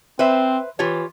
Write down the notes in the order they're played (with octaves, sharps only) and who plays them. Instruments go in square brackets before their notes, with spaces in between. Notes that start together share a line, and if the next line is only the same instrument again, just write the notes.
[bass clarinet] C4 [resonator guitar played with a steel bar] B4 C5 E5
[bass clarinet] E3 [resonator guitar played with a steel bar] F4 G4 C#5